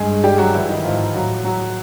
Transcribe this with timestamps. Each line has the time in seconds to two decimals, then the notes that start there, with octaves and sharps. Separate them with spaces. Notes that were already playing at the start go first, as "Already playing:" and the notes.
Already playing: G2 G#3 G#4
0.24 G3 G4
0.38 F#3 F#4
0.54 E3 E4
0.69 D#3 D#4
0.84 G#2 F3 F4
1.14 A2 F#3 F#4
1.45 F#3 F#4